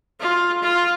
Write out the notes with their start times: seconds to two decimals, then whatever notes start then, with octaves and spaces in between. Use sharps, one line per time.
0.20 F4
0.62 F4